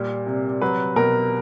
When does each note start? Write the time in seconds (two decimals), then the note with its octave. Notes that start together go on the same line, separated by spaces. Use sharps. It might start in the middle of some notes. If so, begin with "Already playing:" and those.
Already playing: A#2 G3
0.27 C3
0.62 F#3 B4
0.96 B2 A#4